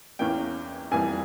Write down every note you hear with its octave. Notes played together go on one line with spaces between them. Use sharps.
E2 E3 A#3 C#4 G5
F2 E3 G3 A#3 G#5